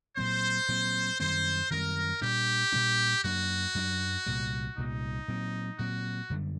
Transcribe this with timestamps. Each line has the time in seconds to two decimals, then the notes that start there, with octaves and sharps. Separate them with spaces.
0.17 A#2 F#3 C4 C5
0.69 A#2 F#3 C4
1.20 F#2 D#3 G3 C4 C5
1.70 F#2 D#3 G3 C4 A#4
2.21 A#2 G3 D4 G4
2.72 A#2 G3 D4
3.24 F#2 F#3 A#3 D4 F#4
3.75 F#2 F#3 A#3 D4
4.26 C2 A#2 G3
4.77 C2 A#2 G3 D#4
5.28 A#2 F#3 C4
5.79 A#2 F#3 C4 F#4
6.30 F#2 D3 G3